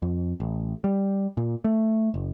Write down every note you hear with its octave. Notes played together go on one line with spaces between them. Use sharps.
F2
A1
G3
A#2
A3
F#1